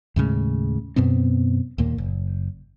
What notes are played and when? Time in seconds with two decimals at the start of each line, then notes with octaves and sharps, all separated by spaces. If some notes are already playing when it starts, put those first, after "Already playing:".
0.16 D#2 A2 C#3 G#3
0.96 F#2 B2 B3 C4
1.78 D#2 A#2 A#3
1.98 F#1